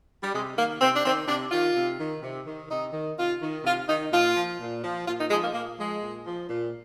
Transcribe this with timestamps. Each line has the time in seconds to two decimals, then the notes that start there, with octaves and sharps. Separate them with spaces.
0.23 G3
0.33 C3 G#3
0.56 D#3 A#3
0.80 C3 C4
0.93 D4
1.04 D#3 C4
1.27 C3 D4
1.51 D#3 F4
1.75 C3
1.99 D#3
2.22 C3
2.46 D#3
2.69 C3 D#4
2.93 D#3
3.17 C3 F4
3.41 D#3
3.64 C3 F4
3.88 D#3 D#4
4.11 A#2 F4
4.35 F3
4.59 A#2
4.83 F3
5.06 A#2 F4
5.18 D#4
5.30 F3 G#3
5.42 A#3
5.53 A#2 A#3
5.77 F3 G#3
6.00 A#2
6.25 F3
6.48 A#2